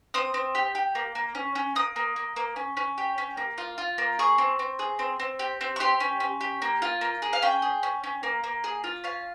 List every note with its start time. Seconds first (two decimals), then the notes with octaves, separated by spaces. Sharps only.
0.14 C4 D#6
0.34 C4
0.55 G4
0.75 G4
0.95 A#3
1.15 A#3
1.35 C#4
1.55 C#4
1.75 A#3 D#6
1.96 A#3
2.16 A#3
2.36 A#3
2.56 C#4
2.77 C#4
2.98 G4
3.18 C#4
3.37 A#3
3.58 F4
3.78 F4
3.98 A#3
4.19 G#4 C#6
4.38 C4
4.59 C4
4.79 G#4
4.99 C4
5.20 C4
5.39 G4
5.61 C4
5.76 C#6
5.80 G4 C6
6.00 C#4
6.20 C#4
6.41 G4
6.62 A#3
6.82 F4
7.01 A#3
7.22 G#4
7.33 F5
7.42 C#4 G5
7.62 G#4
7.83 C#4
8.04 C#4
8.23 A#3
8.44 A#3
8.64 G#4
8.84 F4
9.04 C#4 F5